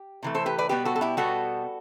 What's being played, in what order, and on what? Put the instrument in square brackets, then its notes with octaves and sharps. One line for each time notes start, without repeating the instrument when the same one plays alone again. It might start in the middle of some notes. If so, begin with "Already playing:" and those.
Already playing: [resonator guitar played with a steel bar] G4
C3 E3 A3
A4 C5
G4 B4
B4 D5
B2 G3 B3 G4 B4
F#4 A4
A4
E4 G4
B2 G3 B3 F#4 A4